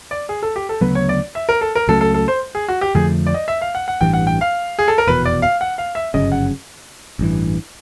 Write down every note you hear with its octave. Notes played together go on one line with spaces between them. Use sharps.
D5
G#4
A4
G4
A4
D2 C#3 F#3 B3 B4
C#5
D5
E5
A#4
A4
A#4
C#2 C#3 F#3 A3 A4
A4
A4
C5
G#4
F#4
G4
F2 D3 F3 A3 G#4
D5
D#5
E5
F5
F#5
F#5
A1 G2 E3 G5
F#5
G5
F5
G#4
A4
A#4
F1 E2 B2 B4
D5
F5
F#5
F5
E5
G1 F#2 C#3 D#5
F#5
A1 G2 E3